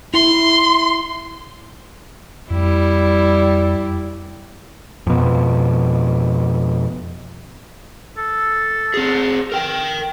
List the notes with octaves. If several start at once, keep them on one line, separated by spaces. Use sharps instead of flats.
E4 C6
F2 G3 E4
F2 B2
A4
C4 G#4
A#4 G5